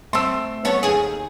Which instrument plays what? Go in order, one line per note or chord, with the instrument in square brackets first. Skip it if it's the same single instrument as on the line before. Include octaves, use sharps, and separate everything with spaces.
[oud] A3 C4 [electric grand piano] C6 E6
[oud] B3 A4 C#5
D#2 G#4